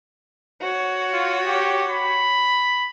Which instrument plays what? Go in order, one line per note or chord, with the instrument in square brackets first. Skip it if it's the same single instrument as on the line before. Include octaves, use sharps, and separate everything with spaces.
[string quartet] F#4 C#5
[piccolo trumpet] F4
G4
B5